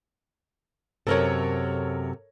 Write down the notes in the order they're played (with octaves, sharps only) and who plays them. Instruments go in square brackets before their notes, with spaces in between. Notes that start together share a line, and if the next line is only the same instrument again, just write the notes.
[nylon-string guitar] F#2 A2 C3 [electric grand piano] A4 A#4 C#5